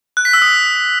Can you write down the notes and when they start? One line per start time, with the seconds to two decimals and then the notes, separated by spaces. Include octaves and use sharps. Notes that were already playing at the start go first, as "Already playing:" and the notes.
0.17 F#6
0.25 B6
0.33 E6
0.42 D#6